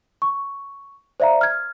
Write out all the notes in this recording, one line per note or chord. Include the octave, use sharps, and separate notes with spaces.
C#6
C5 D5 E5 F5 A#5
F6 G#6